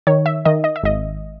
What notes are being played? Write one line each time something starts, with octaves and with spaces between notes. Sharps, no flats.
D#3 C#5
E5
D#3 D#5
D#5
E5
G#1 D#5